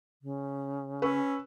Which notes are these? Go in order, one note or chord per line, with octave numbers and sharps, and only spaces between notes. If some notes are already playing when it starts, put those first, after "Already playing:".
C#3
C#4 B4 C#6 E6